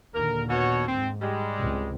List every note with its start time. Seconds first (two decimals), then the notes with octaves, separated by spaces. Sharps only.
0.14 D#2 A#2 D3 A#4
0.50 B2 F#4 C#5
0.87 G#2 C4
1.21 G3 G#3
1.59 C#2 C3